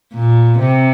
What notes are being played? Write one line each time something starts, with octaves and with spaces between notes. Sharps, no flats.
A#2
C3